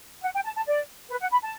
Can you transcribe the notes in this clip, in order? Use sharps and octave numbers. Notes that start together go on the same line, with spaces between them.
F#5
G5
A5
A5
D5
B4
F#5
B5
A5